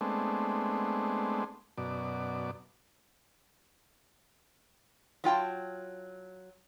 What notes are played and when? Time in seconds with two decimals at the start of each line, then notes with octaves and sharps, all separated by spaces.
0.01 G#3 A3 B3 C4 D4
1.78 F#2 B2 D5
5.24 F#3 F4 G5 A5